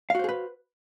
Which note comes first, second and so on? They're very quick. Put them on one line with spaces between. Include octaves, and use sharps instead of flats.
F5 F#4 C5 G#4 B4